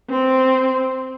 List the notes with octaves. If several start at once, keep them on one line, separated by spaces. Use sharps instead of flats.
C4